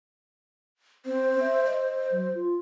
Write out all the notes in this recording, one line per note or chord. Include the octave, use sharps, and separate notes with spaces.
C4 C5
E5
C5 D#5
F#3
F4